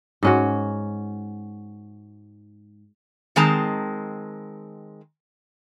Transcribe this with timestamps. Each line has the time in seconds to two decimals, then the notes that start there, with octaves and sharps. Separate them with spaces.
0.23 G#2 C#4 F#4
3.36 D#3 G#3 C4 A5 A#5